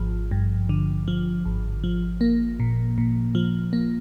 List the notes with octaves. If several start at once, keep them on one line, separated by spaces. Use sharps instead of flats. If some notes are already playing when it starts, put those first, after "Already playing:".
Already playing: G#1 F3
G2
D3
F3
G#1
F3
A#3
A#2
A#2
F3
A#3